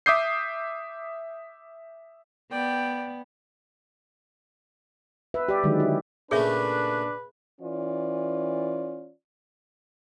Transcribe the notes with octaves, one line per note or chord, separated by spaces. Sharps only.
E5 D6 D#6 G6 C7
B3 D5 G5
B4 E5
G4 D5
D3 D#3 F#3 G#3
E4
A#2 C#3 A3 D4 G#4 B4 C#5 E5
E3 C#4 F4 D5